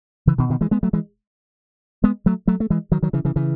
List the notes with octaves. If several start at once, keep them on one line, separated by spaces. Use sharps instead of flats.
C#3 E3
B2 D#3
B2 D#3
E3 G#3
G#3 B3
F#3 A3
E3 G#3
G#3 B3
F#3 A3
F#3 A3
A3
E3 G#3
D#3 F#3
D#3 F#3
C#3 E3
C#3 E3
C#3 E3